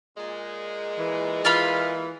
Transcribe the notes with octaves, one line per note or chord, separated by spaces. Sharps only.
A#2 G#3
E3
E3 F4 F5 B5